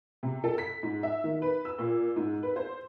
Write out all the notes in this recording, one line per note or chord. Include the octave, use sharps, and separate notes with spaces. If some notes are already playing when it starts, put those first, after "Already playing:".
C3
A4
B6
G#2
E5
D#3
B4
E6
A#2
G#2
B4
C5